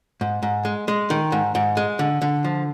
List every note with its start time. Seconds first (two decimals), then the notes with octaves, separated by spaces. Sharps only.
0.21 G#2
0.43 G#2
0.65 G#3
0.88 G#3
1.10 D#3
1.32 G#2
1.55 G#2
1.77 G#3
1.99 D3
2.22 D3
2.44 F3